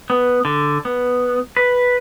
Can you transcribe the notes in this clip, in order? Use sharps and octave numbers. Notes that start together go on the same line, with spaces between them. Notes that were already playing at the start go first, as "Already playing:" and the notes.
B3
D3
B3
B4